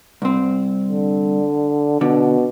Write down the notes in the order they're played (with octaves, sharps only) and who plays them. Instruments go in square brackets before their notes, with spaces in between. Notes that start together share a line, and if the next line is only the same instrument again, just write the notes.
[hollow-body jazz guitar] C2 C4
[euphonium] D3
[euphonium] B2 [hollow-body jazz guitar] D3